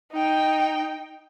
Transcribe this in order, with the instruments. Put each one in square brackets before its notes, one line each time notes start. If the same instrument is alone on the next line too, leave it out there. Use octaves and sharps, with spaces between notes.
[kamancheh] D#4 G5